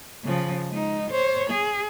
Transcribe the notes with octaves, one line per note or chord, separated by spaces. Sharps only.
C#3 F3
G#3 D#4
C5 C#5
G#4